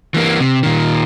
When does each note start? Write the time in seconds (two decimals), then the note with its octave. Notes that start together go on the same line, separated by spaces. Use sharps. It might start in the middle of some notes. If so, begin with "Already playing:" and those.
0.14 E3 A#3
0.41 C3
0.63 A#2 D#3